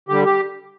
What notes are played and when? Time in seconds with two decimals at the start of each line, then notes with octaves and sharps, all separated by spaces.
0.09 D3 G3 G4
0.25 G4